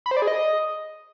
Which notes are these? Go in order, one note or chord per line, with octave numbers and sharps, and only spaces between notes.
B5
C5
D5
G#4
D#5